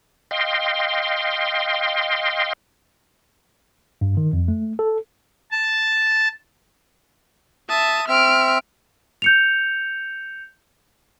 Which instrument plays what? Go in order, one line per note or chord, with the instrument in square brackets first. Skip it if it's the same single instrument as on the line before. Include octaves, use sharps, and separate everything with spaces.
[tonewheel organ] D#5 F5 G5 C6
[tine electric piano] G2
D#3
F2
A3
A4
[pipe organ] A5
[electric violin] E5 A5 [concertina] D#6
[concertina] C4 E5 [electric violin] F6 D7
[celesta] G6 C#7 F7